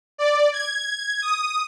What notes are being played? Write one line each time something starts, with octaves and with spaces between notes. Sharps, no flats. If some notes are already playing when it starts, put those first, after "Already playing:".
D5
G#6
D#6